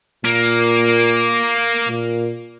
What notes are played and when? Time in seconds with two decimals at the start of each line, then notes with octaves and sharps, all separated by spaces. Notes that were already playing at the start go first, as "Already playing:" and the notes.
0.25 A#2 A#3
1.88 A#2